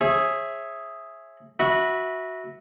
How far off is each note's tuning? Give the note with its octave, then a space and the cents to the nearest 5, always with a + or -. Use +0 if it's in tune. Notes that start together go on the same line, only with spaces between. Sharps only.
G#4 +0 C#5 -40 E5 +0
F#4 +0 B4 -20 E5 -15